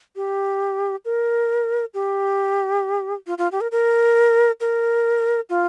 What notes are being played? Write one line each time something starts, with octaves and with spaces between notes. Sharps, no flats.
G4
A#4
G4
F4
F4
G4
A#4
A#4
A#4
F4